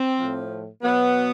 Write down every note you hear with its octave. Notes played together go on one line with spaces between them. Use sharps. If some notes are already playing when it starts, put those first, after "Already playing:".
Already playing: C4
A2 F3
B2 F#3 B3